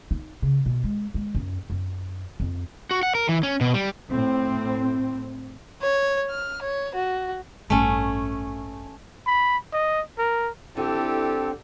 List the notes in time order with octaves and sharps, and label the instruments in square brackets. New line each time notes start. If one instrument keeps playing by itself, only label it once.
[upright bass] D#4
C#3
B2
G#3
G#3
F#2
F#2
F2
[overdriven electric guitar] F#4
F#5
A#4
E3
C#4
B2
G3
[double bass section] A2 C4
[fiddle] C#5
F6
C#5
F#4
[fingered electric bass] A1 G2 [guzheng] A3 C#4
[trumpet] B5
D#5
A#4
[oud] D3 [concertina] C4 [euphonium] E4 [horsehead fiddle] G4 A4